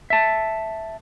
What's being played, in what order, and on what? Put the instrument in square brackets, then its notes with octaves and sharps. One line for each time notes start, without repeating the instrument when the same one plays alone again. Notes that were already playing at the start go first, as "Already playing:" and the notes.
[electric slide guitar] E5 A5